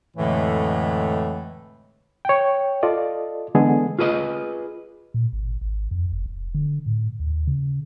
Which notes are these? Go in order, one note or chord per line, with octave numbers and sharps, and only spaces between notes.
F2 A2 D3 E3 G#3 A3
C#5 G5
F4 A4 D5 D#5
D3 E3 G#3 B3 G#4 A4
F4 G#4 B4 D5 D#5
A#2
G#1
G#1
F2
F#1
E1
D3
A2
D#2
C#3